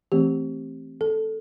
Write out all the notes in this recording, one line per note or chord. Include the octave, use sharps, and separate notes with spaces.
E3 A3 C4 G4
A4